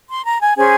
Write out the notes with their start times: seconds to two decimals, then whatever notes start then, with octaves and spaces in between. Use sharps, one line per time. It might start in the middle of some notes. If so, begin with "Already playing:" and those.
0.09 C6
0.26 A#5
0.42 G#5
0.57 C#4 G#4 C5 G#5